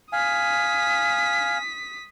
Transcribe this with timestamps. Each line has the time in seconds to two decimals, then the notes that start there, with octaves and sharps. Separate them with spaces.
0.13 F5 G#5 D#6 B6